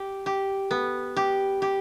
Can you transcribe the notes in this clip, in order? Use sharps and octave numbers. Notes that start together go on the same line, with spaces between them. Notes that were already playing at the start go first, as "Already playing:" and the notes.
Already playing: G4
G4
B3
G4
G4